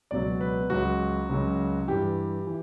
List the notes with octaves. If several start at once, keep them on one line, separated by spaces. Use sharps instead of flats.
C#2 B2 F#3 D5
B4
C#2 C#3 F#3 F#4
C#2 C#3 F#3
G2 E3 G4
E3